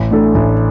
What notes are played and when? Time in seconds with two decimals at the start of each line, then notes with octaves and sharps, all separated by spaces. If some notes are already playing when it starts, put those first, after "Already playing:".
Already playing: A1
0.11 A2 A3 D4 A4
0.35 A1